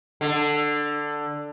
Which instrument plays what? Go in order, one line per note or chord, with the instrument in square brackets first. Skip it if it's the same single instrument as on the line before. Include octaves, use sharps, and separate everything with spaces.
[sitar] D3